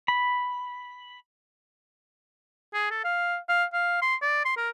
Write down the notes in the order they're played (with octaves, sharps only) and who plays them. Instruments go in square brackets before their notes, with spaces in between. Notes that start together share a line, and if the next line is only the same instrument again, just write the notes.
[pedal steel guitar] B5
[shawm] G#4
A4
F5
F5
F5
C6
D5
C6
A#4